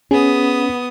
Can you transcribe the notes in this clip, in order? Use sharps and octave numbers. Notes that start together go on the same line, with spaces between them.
B3 C#4 G#4 D#6